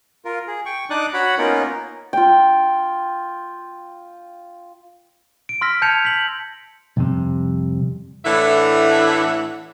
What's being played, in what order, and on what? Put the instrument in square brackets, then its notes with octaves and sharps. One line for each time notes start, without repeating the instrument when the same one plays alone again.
[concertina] F4 A#4
G#4
G5 C#6
D4 D#4 D5 D6 D#6 F#6
F#4 C#5 F#5 B5
A#3 B3 C#4 D#4 F4 A#4
[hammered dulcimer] F4 G5
[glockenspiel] D7
C6 E6 F6 A#6 B6
A5 G6 G#6 C#7 F7
B6 F#7
[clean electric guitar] C2 F2 C3
[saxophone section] A2 E3 A3 D4 E5 F#5